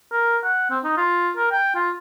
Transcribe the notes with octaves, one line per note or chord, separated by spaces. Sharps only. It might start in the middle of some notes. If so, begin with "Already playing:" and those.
A#4
F#5
C4
D#4
F4
A#4
G5
F4